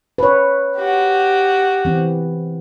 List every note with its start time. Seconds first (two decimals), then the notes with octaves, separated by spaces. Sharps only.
0.18 B4 C#5
0.77 F#4 G4
1.85 E3 C4